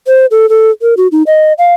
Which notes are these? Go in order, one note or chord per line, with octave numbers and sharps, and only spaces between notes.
C5
A4
A4
A#4
F#4
D#4
D#5
F5